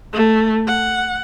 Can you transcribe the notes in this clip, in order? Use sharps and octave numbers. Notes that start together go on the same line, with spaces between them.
A3
F#5